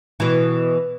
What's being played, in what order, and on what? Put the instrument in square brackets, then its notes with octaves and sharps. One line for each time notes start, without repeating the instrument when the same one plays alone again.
[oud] B2 E3